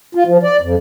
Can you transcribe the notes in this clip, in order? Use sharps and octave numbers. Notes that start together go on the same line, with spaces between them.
F4
F3
D5
F2